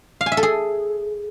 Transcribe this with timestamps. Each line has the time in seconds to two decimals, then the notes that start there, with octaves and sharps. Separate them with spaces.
0.21 F5
0.26 G#5
0.32 E5
0.37 A4
0.43 G#4